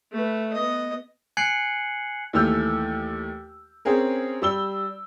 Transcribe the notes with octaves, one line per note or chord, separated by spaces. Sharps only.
A3 B4
B3 D#5
G#5 F#6 G#6 C7 C#7 F#7
D#2 E3 A3 E6 F6 G6
C4 C#4 G#4 A#4
G3 E6 G7